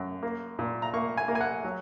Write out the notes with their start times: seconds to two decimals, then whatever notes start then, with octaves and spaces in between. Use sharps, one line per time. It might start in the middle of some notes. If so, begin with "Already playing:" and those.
Already playing: F#2
0.23 A#3
0.59 A#2
0.82 A#5
0.94 A#3 C#6
1.17 G#5
1.28 A#3
1.35 G#5
1.41 F#5
1.64 F#3